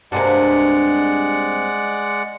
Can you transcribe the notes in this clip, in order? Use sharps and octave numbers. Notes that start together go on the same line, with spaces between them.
G2 C3 G#3 A#3 D5 F#5